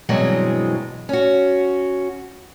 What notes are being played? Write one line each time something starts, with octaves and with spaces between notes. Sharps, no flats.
G2 B2 E3 F#3 G#3 C4
C#4 F#4